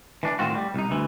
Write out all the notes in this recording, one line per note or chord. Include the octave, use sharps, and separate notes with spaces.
E3 D4
A2 D#3 C4 F4 F#4
G3
C2 D#4
D2 E3